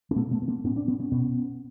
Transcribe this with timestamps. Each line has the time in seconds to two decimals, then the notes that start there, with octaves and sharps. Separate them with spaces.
0.11 C4
0.16 A#2 A3 B3
0.31 A3 B3
0.42 B3
0.48 A#3 C4
0.64 A2 B3 C#4
0.76 C4 D4
0.88 B3 C#4
1.00 B3 C#4
1.12 B2 B3 C#4